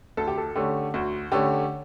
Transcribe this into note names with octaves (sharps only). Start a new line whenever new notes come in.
D2 A4
G4
A4
D3 A3 C#4 G4
D2 F#4
D3 A3 C#4 G4